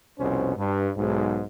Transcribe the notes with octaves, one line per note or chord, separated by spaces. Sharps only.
C2 F2 B2 C#4 C5
G2
B1 G#2